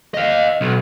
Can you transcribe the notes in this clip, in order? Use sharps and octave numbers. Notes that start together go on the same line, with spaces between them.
D#5 F5
B1